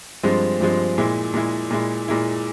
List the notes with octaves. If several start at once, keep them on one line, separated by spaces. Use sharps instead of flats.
G2 F3 G#3 C4
G2 F3 G#3 C4
A#2 G#3 E4
A#2 G#3 E4
A#2 G#3 E4
A#2 G#3 E4